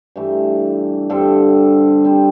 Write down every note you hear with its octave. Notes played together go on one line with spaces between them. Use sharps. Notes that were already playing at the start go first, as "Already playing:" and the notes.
G2 E3 A3
G2 D3 C4 A4
G3 C4 A4 C5